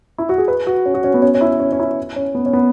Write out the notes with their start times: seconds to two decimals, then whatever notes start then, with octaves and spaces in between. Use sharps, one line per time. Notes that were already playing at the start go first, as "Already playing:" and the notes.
0.18 E4
0.29 F#4
0.38 G#4
0.48 B4
0.67 F#4
0.85 C#4
0.94 F#4
1.04 C#4
1.14 B3
1.22 C#4
1.34 C#4
1.41 E4
1.60 C#4
1.72 C#4
1.80 E4
2.16 C#4
2.35 B3
2.46 C#4
2.53 B3